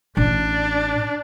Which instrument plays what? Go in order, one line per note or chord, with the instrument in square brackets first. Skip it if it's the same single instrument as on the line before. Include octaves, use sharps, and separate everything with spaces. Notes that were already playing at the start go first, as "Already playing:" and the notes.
[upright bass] A1 [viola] D4